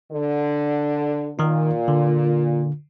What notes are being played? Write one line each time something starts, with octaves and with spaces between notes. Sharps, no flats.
D3
A#2 D#3 D#4
D3